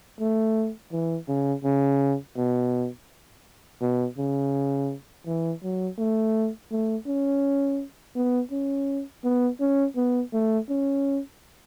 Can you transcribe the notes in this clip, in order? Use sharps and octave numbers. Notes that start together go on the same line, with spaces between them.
A3
E3
C#3
C#3
B2
B2
C#3
E3
F#3
A3
A3
C#4
B3
C#4
B3
C#4
B3
A3
C#4